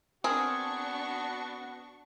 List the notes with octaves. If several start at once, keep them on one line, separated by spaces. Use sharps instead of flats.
B3 C4 D4 F#4 G#4 A#4 C#6